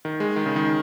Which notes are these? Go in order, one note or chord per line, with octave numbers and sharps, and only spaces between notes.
D#3
G#3
D#3
C#3
D#3